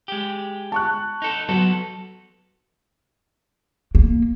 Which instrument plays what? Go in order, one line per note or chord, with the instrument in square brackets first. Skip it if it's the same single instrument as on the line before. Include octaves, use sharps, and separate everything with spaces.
[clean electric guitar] G#3 G4
[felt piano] A5 C#6 F#6
[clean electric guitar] D#4 A4
[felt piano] F#3 [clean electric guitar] B3 F#4 A4
[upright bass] A#3